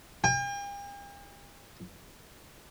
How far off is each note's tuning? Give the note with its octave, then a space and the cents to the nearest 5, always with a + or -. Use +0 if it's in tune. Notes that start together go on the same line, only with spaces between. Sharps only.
G5 +45